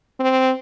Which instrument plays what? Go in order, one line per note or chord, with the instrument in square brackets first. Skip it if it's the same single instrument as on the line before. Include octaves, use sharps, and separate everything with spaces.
[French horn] C4